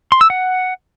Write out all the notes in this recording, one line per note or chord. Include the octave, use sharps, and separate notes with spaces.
C6
E6
F#5